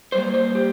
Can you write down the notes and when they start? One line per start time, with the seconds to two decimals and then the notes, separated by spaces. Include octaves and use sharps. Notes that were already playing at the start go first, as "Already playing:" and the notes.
0.12 G2 G3 A#3 C5
0.34 C5
0.55 G4